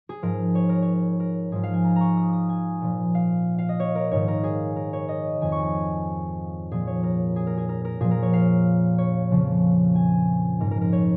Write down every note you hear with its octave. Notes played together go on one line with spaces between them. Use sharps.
G#4
G#2 F3 A#4
C#5
A#4
C#5
A#4
G#2 F3 G#4
F5
G#5
A#5
A#5 C#6
D#6
D#6
G#5
A#2 F3
F5
F5
D#5
C#5
A#4
G#2 D#3 C#5
A#4
G#4
A#4
C#5
D#5
F2 D#3 G#5
C#6
G#5
A#2 F3 G#4
C#5
A#4
G#4
A#4
G#4
A#4
A#4
A#2 F3 G#4
A#4
C#5
F5
C#5
F2 C#3 F3
G#5
G#2 F3 A#4
A#4
A#4
C#5